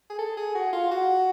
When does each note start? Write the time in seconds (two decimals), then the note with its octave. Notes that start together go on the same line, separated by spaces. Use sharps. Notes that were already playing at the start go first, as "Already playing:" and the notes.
0.10 G#4
0.19 A4
0.37 G#4
0.55 F#4
0.73 F4
0.91 F#4